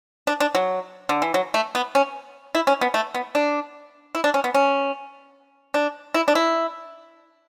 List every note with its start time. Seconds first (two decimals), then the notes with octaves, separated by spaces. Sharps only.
0.27 D4
0.40 D4
0.55 F#3
1.09 D3
1.22 E3
1.34 F#3
1.54 A3
1.75 B3
1.95 C#4
2.55 E4
2.67 C#4
2.81 B3
2.94 A3
3.14 B3
3.35 D4
4.15 E4
4.24 D4
4.34 C#4
4.44 B3
4.54 C#4
5.74 D4
6.14 E4
6.28 D4
6.35 E4